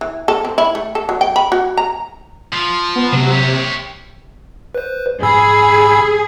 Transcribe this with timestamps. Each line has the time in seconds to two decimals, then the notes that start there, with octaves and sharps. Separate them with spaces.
0.01 E3
0.28 A4
0.45 C4
0.58 E4
0.75 A3
0.95 A4
1.09 F#3
1.21 G5
1.36 B5
1.52 F#4
1.77 A#5
2.53 F3
2.96 B3
3.13 C#2 C3 F#3
3.31 G4 C#5
4.75 B4 C5
5.23 G#2 G#4 B5 E6